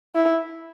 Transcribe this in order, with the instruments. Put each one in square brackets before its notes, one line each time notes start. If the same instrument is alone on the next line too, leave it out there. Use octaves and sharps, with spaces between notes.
[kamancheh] E4